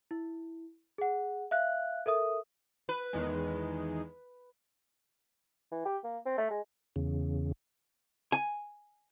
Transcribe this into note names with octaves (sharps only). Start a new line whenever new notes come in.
E4
G#4 F#5
E5 F5 F#6
A4 A#4 E5 D#6
B4
E2 D#3 G#3
E3
G4
A#3
C4
A3
G#3
E2 C#3
G#5